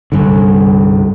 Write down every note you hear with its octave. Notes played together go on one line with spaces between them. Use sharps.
C2 G2 D3